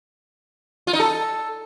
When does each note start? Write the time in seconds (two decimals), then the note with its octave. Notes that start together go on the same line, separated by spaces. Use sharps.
0.87 F4
0.93 D#4
1.00 A4